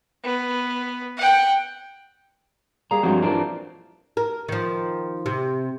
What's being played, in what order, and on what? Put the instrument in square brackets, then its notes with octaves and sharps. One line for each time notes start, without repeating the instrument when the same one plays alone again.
[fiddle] B3
F#5 G5
[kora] G3 A#3 G#4 [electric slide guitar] A#5
[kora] G2 F#3 G#3 [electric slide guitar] F3 C4 F#4
[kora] E3 A#4 [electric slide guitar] D4 F4 C5
[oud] A#4
D#3 F3
C3